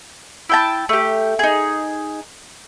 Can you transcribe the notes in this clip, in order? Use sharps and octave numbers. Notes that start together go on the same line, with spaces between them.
E4 G5 A5
A3 G4
D#4 G#4